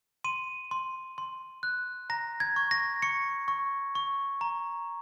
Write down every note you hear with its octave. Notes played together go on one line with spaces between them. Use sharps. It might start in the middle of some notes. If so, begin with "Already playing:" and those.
C6 D#7
C6
C6
F#6
A#5 A#6
G#6
C#6
A#6
C#6 C#7
C#6
C#6
A#5